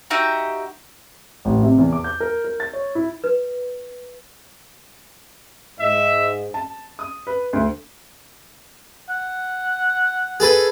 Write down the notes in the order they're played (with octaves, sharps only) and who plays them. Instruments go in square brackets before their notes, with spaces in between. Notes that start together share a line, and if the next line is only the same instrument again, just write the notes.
[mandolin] D#4 F#4 G4 E5
[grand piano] A1
C3
E2
D6
G6
A#4
A#4
A6
C#5
E4
[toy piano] B4
[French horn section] G#2 D#5 [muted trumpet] E5
[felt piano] A5
D#6
B4
D2
[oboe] F#5
[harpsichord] G#4 A4 B4